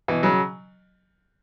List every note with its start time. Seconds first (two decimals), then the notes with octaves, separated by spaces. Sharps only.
0.08 B2 E3
0.23 C#3 F#3